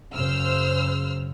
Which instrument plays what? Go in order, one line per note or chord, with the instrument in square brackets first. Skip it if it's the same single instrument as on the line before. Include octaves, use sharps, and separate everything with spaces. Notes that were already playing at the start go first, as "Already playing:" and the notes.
[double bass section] F#2 C#3 [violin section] C5 E6 F6